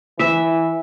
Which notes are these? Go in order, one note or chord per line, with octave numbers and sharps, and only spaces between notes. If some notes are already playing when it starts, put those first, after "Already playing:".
E3 E5